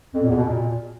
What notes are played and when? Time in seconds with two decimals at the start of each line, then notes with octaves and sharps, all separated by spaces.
0.14 F2
0.21 A#2
0.29 E2
0.36 B2
0.43 A#2